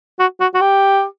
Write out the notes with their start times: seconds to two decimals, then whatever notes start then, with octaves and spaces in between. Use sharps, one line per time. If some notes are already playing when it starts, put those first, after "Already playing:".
0.20 F#4
0.40 F#4
0.54 F#4
0.61 G4